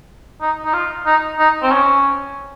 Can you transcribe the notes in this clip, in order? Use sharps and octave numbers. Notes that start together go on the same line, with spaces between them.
D#4
D#4
F4
D#4
D#4
C4
C#4